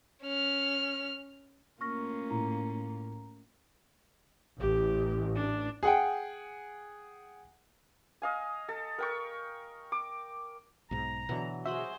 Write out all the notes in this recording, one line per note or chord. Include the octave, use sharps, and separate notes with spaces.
C#4 F6
A3 A#3 C#4 F4 C#6 F6 A#6
A2 A#5
A1 G4
D4
G#4 F#5 G5
D#5 F5 G#5
A4
A#4 G5 C#6
D6
B1 G#2 A#5
B2 D3 E3 F#3 F#5
F#4 G#4 C5 D#5 E5 B5